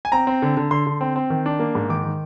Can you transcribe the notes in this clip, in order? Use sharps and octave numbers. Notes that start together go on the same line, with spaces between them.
G#5
C4 A#5
C4
D3
D3
D3 C6
D3
C4
C4
D#3
D4
A#3
G#2
D#3 D6
D#3